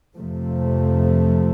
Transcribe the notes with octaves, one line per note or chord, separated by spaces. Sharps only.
F2 C3 F3 A3